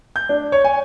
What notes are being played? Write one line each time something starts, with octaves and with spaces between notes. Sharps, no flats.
G6
D4
C#5
G#5